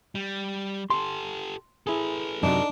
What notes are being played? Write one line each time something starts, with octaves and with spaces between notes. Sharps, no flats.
G3
G4 A4 C6
E4 G#4 A4 B4
F#2 C3 F#3 D4 D#4